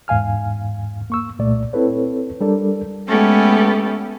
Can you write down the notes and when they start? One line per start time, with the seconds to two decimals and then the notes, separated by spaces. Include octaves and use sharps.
0.08 E2 G#2 F5 G#5 F6
1.10 A#3 C#6 E6
1.39 C2 A#2 A3 D5
1.73 C4 E4 A4 B4 C#5
2.41 G3 D4 A4 A#4 D5
3.07 G#3 A3 B3 C#4 G4 A4